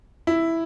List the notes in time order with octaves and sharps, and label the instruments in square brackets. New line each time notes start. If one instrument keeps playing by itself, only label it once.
[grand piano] E4